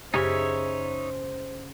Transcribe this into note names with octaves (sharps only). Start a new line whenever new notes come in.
F#2 C#3 D#4 G4 G#4 C5 C#5 E5